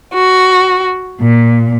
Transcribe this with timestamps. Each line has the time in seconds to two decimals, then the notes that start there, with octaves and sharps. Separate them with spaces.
0.13 F#4
1.20 A#2